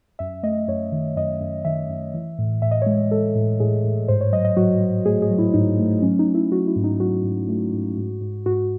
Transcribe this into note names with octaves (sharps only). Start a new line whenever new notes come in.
F#2 E5
A3 D#5
F#2 C#5
D#3
F#2 D#5
F#2
D#3 E5
F#2
E3
A2
A2 E5
D#5
C#5
G#3 D#5
G#3 A4
A2
A2 G#4
A2
G#2 C5
C#5
F#3 D#5
D#5
F#3 F#4
F#3
A3 G#4
G#4
F#3
E4
G#2 D#4
A3
F#3 C#4
D#4
F#3
E4
F#3 F#4
E4
G#2
D#4
F#3 F#4
G#2
A3
G#2
G#2
G#2
G#2 F#4